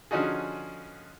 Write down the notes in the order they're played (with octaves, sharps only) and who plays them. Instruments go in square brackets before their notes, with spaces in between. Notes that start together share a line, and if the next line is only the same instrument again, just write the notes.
[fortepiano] D3 F3 C#4 D#4 F#4 G#4